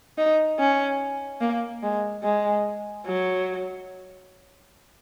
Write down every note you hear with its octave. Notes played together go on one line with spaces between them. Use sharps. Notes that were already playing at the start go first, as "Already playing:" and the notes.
D#4
C#4
A#3
G#3
G#3
F#3